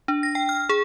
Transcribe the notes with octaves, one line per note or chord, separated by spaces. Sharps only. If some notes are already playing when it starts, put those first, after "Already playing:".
D4
A#6
G5
F6
G#4